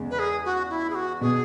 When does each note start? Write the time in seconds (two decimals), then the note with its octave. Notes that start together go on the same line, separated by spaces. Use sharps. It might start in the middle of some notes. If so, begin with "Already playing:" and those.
Already playing: E2 C#3 G#3
0.10 B4
0.19 G#4
0.45 F#4
0.70 E4
0.90 G#4
0.95 F#4
1.21 B2 B3 G#4